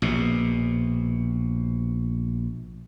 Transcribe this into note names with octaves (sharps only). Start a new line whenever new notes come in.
A#1 B2